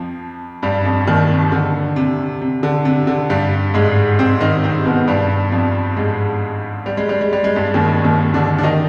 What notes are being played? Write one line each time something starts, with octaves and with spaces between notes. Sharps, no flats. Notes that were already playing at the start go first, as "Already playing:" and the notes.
Already playing: F2 F3
G2 G3
F2 F3
D#2 D#3
C3
D3
C3
C3
D3
C3
D3
G2 G3
G#2 G#3
C3 C4
D#3 D#4
C3 C4
B2 B3
G2 G3
F2 F3
G#2 G#3
G3
G#3
G3
G#3
G3
G#3
G2 G3
D#2 D#3
D#2 D#3
D3 D4
D4
D#3 D#4